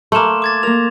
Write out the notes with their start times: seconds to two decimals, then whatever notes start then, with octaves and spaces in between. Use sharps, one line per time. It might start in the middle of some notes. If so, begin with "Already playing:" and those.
0.12 A3 A#3 C6 E7
0.42 D6 G#6 A6
0.63 A#3 A#4 F7